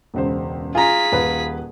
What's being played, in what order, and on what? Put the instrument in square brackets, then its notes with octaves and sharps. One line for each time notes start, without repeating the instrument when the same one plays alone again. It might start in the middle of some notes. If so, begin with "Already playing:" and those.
[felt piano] E1 C#2 C5
[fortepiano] F4 A#5 [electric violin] G#4 B6 [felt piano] G#5
[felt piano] D#1 B4